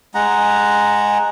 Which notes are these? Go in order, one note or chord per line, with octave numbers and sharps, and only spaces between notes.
G#3 F#5 A#5